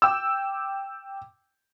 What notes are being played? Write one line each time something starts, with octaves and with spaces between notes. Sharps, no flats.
G5 D6 E6